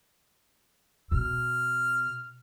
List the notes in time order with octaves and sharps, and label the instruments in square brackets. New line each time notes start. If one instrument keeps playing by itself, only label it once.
[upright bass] B2 [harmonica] F6